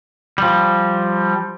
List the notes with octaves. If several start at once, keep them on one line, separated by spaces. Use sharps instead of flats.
F3 G3